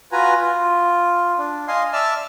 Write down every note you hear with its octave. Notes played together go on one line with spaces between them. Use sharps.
F4 F#4 B4 G#5 A#5
F4
D4
D#5 F5 G#5 C6
D5 E5 A5 E6 F6